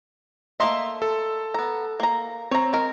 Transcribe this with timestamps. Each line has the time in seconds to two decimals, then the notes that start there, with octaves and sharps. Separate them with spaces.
0.60 A3 A#3 D#5 E5 A#5 C6
1.02 A4
1.54 B3 A#5
2.00 A#3 A#5
2.51 C4 C#5 A#5
2.73 G#3 A#4